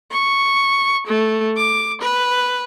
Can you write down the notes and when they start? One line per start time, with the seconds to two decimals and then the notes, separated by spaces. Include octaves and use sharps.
0.12 C#6
1.07 A3
1.57 D6
2.01 B4